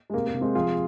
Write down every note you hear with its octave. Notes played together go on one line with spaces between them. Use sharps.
G#3
C3 A#3
A#3
C3
G#3 C4
F3 F4 G#4